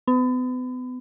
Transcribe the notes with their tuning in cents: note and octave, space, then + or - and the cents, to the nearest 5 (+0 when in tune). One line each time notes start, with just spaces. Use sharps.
B3 +35